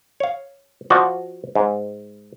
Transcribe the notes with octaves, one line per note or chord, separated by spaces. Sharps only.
C#5 F5
F3 F#4 D5 D#5
G#2